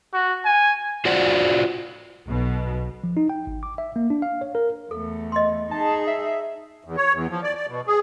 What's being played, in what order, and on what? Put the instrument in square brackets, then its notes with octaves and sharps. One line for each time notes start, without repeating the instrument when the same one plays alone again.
[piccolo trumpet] F#4
G#5
[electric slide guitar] F4 F#4 C5 D5 F#5
[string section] B1 B2
[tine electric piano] F3
D#4
G5
G#1
D6
E5
A#3
D4
F5
C#5
A#4
[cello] E2 A3 [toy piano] A4
[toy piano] D#5 C6
[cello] D#4 G#4 [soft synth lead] A5
[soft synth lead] E5
[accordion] E2
C#5
E2
F3
D5
D5
B2
G#4